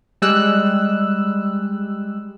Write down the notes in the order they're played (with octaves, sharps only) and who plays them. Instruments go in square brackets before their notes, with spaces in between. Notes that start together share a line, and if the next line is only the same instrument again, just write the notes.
[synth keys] G3 G#3 E6 F#6